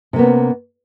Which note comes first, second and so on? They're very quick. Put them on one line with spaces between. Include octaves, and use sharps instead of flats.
C3 A#3 B3 C#4